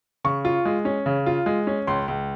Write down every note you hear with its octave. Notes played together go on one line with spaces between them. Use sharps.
C#3 C#6
F4
G#3
C#4
C#3
F4
G#3
C#4
C#2 C6
C#2